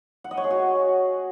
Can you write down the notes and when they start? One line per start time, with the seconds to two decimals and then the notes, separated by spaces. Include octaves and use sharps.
0.24 F#5
0.31 D#5
0.37 C#5
0.44 G#4
0.50 F#4